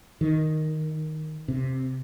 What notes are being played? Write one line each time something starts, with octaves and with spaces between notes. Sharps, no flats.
D#3
C3